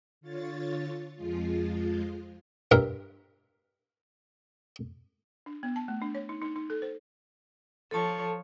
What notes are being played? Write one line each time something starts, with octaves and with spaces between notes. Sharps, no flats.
D3 F4 C#5 A6
F2 F3 G#3 F4
G2 A#4 E5
D4
B3
A5
A3
D4
C#5
D#4
D#4
D#4
A4
C5
F3 A4 C#5 A5